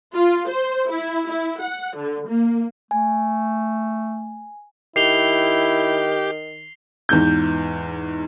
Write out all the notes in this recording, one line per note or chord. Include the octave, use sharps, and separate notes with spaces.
F4
C5
E4
E4
F#5
D3
A#3
A3 G#5
D#3 E4 G4 C7 F7 G7
E2 G#2 G6